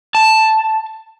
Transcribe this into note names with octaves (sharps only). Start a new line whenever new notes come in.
A5